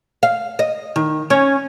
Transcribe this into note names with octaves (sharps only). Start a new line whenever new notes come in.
F5
D#5
D#3
C#4